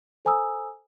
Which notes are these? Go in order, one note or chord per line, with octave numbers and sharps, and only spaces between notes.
A4 C5 G#5 A#5 D#6 E6